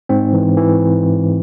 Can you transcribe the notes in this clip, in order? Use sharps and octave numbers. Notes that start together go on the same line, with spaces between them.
G#2 C4
E3
E3